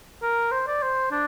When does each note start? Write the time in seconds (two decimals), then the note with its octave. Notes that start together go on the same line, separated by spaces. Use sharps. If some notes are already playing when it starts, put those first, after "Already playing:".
0.22 A#4
0.52 C5
0.67 D5
0.83 C5
1.12 D4